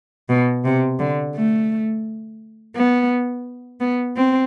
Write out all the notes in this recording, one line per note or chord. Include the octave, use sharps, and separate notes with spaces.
B2
C3
D3
A3
B3
B3
C4